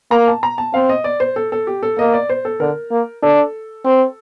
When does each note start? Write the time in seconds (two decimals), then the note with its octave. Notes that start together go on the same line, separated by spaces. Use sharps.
0.11 A#3 A#5
0.28 A5
0.43 A#5
0.58 A5
0.74 C4 F5
0.89 D#5
1.04 D5
1.20 C5
1.36 A4
1.52 A4
1.67 G4
1.83 A4
1.98 A#3 D#5
2.13 D5
2.29 C5
2.45 A4
2.60 D3 A#4
2.92 A#3
3.23 D4 A4
3.85 C4